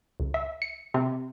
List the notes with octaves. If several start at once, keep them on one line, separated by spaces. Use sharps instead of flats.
C#2
E5
C#7
C3